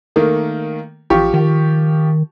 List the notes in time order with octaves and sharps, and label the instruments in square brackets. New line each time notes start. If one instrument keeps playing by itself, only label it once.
[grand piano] D#3 A3 A#3
[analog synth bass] A1 [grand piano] F3 G4 C#6
[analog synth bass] D#3